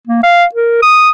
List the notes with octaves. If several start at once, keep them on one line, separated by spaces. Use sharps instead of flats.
A#3
F5
A#4
D#6